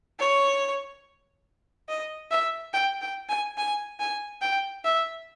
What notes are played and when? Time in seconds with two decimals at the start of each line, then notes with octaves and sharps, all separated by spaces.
0.20 C#5
1.89 D#5
2.31 E5
2.73 G5
3.01 G5
3.29 G#5
3.57 G#5
4.00 G#5
4.42 G5
4.84 E5